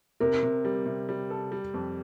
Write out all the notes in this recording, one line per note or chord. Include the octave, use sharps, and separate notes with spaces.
C3 A#4
C3
G3
C3
G3
A4
G3
F2